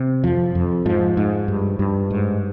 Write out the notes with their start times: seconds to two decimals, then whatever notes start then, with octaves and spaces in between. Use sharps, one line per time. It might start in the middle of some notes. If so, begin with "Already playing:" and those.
Already playing: C3
0.24 F2 F3
0.55 F2
0.86 G#2 F3
1.17 G#2
1.48 G2
1.79 G2
2.10 G#2